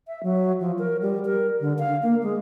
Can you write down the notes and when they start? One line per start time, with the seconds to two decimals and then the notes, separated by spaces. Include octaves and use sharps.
0.08 E5
0.23 F#3
0.60 F3
0.79 A#4
1.02 G3
1.25 A#4
1.60 D3
1.79 F5
2.03 A#3
2.22 G#3